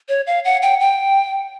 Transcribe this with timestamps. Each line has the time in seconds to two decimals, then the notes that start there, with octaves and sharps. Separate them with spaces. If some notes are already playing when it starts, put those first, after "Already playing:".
0.09 C#5
0.27 F5
0.45 F#5
0.62 G5
0.80 G5